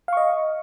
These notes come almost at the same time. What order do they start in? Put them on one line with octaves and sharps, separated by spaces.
F5 C#6 D#5